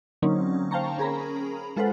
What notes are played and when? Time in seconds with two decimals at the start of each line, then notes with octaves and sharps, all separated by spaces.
0.22 D3 F#3 A#3 C4 C#4 D#4
0.71 C5 F5 G5 A5 A#5 C#6
0.98 C#4 G#4 A#4 A#5 B5
1.76 G#3 F4 A4 B4 C5 F#5